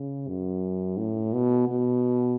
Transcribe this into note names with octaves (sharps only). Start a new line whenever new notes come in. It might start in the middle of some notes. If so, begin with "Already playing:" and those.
Already playing: C#3
F#2
A2
B2
B2